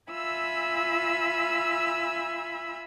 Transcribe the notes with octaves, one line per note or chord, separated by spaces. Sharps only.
F4 E5 G#5 B5 E6